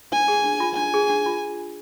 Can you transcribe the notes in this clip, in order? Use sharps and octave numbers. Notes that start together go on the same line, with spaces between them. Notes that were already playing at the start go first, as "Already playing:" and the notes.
D4 G#5
G#4
D4
F4
D4 G#5
G#4
D4
F4